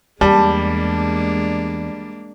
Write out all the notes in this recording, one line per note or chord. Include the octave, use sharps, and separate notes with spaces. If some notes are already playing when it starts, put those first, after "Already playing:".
E2 G3 G#3 A#3 D4 A5